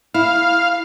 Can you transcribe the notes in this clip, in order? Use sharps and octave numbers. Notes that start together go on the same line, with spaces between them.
E4 F5